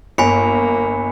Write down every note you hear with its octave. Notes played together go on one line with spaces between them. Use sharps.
G1 A#3 G#5 B5 C#7